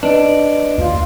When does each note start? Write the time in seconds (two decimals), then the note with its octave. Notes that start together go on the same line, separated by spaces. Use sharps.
0.03 D4 B4 D#5 D7
0.78 D#2 F4